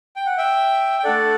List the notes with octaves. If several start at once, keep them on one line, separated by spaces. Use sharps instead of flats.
G5
F#5
E5 G5
G5
A3 D4 A4 D5 F#5